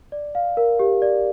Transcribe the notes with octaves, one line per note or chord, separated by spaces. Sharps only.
D5
F5
A#4
G4
D5